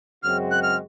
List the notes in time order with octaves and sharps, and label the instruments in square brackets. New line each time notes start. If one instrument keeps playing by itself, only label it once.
[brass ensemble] F#2 C#3 G#3 C4 F#4 [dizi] F6
[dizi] F#6
F6